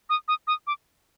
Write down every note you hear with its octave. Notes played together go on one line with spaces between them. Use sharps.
D#6
D#6
D#6
D6